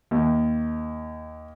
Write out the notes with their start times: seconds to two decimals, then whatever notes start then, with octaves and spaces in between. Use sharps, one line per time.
0.11 D#2